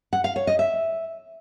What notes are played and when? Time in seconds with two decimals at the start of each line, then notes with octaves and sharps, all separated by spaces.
0.13 F#5
0.24 F5
0.36 C#5
0.47 D#5
0.59 E5